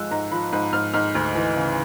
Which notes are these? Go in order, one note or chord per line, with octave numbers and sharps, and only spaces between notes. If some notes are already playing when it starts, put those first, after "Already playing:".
Already playing: G#2 F3 G#3 E6 F#6
G#2 A#5
F3 B5
G#2 B5
G#2 F6
G#2 F6
D2 F6
E3
C#3